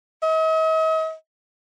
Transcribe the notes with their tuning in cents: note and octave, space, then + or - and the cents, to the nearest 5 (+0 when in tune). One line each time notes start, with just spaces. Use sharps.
D#5 +45